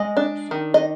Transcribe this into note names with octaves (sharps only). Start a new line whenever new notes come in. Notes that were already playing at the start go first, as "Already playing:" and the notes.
Already playing: G#3 D#5
D4
D#3
D#5